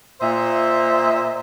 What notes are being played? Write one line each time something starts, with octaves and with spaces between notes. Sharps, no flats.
A#2 C5 D#5 E5